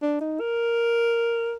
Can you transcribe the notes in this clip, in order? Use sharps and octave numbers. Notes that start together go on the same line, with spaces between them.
D4
D#4
A#4